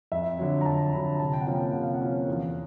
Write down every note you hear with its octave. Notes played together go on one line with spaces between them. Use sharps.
F2 E5
D3 F#3
A#5
F2 A5
D3 F#3 B5
A#5
C3 A5
G5
F#5
F3 A#3 C#4 G5
G5
C3 F#5
F5
F#5
F3 A#3 C#4
E2